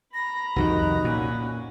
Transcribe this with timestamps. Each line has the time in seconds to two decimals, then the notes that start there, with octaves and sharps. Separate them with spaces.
0.14 A#5 B5 A#6
0.56 C2 F2 D#3 D#4 F#4
1.05 A#2 C#4 B5